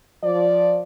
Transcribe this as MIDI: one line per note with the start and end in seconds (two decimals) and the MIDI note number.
0.24 0.81 53
0.24 0.81 74